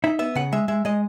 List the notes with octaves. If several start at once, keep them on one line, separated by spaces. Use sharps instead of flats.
D#4 E5
B3 E5
C#3 F#5
G#3 E5
G#3 E5
G#3 D#5